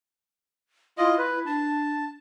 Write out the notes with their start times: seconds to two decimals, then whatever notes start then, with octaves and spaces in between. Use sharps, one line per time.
0.98 E4 F4 D#5
1.18 B4
1.46 D4 A5